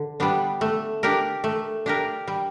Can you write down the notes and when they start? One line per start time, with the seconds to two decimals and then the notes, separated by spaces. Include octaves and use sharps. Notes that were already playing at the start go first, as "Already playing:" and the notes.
Already playing: D3
0.20 G3 B3 D4
0.61 A3
1.03 D4 G4 A#4
1.44 A3
1.86 D4 G4 A#4
2.28 G3